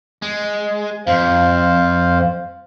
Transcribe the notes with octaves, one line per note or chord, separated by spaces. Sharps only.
G#3
F2 C5 F5